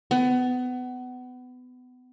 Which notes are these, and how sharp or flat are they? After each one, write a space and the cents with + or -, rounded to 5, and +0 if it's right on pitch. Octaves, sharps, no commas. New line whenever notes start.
B3 +25